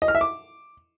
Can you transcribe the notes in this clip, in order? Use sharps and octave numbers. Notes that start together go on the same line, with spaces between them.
D#5
F6
E5
D6